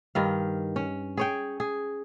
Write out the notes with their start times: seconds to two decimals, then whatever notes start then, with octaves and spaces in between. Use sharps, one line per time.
0.15 G2 D#3 F5
0.76 C#4
1.17 G#4 C#5 G5
1.60 G#4